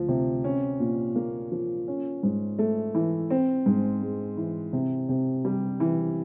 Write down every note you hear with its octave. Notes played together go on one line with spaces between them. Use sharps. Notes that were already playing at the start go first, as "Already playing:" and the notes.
Already playing: D2 F3
C3
C#4
A#2
A#3
F3
C#4
G#2
A3
E3
C4
G#2
G#3
E3
C3
C3
G3
E3